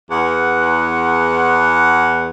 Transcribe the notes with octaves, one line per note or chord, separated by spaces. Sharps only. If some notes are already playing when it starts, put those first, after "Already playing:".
E2 F#5